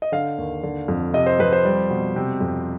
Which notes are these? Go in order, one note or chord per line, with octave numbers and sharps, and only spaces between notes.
D#5
D3 F5
D#2
D3
F2
C3 D#5
C5
F2 B4
C5
G3
B2
C3
F2